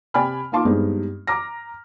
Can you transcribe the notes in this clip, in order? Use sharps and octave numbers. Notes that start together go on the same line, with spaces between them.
C3 D5 G5 G#5 B5 F6
A#3 D#4 F4 A5 C6 D6
G2 G3 G#3 B3 C4 D#4
A#5 D6 F6 A#6